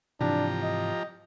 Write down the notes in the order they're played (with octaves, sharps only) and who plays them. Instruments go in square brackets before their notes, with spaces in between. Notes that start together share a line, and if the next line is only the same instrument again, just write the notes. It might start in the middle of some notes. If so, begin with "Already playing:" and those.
[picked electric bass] G#2 C3 E3 [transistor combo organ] F3 G4 A#5 [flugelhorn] D4
[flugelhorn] D#5